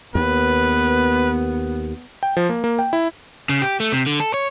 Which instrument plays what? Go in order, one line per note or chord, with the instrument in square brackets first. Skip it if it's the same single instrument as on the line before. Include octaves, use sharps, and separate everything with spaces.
[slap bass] D#2 [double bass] B3 [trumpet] B4
[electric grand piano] G5
F3
A#3
A#3
G5
E4
[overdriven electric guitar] C#3
G4
A3
C3
D3
A4
C#5